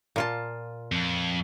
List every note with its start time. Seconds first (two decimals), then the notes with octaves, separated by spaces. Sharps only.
0.16 A#2 F4 A5
0.92 F2